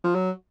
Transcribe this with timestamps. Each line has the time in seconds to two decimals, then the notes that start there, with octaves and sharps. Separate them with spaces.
0.04 F3
0.14 F#3